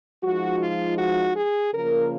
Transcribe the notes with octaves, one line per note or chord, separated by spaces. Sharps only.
F3 G#3 D#4 F#4
F4
F#4
G#4
C#3 F3 A#3 A#4